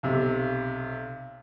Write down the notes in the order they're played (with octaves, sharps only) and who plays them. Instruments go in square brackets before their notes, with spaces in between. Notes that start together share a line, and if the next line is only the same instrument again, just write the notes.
[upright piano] B1 C3